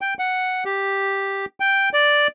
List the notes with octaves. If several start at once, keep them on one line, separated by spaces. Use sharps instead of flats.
G5
F#5
G4
G5
D5